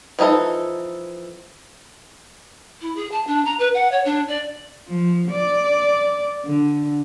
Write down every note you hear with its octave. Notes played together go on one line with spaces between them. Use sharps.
E3 F3 D#4 A4 A#5
E4
G#4
A5
D4
A#5
B4
F#5
C#5
D4
D5
F3
D5
D3